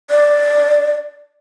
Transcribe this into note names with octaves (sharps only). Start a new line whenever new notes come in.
D5